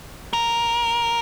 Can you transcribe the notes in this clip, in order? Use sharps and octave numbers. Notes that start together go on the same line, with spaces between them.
A#4